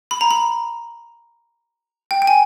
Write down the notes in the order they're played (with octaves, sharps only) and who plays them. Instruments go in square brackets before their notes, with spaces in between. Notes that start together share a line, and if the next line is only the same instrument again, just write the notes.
[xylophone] B5
A#5
B5
G5
G5
G#5